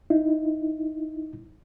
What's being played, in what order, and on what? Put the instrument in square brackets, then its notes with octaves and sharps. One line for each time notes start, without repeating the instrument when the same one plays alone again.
[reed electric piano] D#4 E4